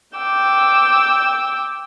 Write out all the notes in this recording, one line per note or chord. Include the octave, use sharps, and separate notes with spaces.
G5 D6 E6